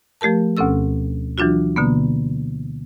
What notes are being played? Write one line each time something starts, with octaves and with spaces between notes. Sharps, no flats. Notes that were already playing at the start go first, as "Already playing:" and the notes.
F3 A3 G4 A#4 A5
D2 B2 C4 C#4 A4 E6
E3 F#3 D4 F4 F#4
B2 D3 A#3 B3